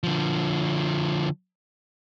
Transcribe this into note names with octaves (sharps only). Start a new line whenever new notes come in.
D3 F3